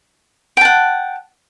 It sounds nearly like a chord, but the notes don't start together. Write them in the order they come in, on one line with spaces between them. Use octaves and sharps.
G5 A5 F#5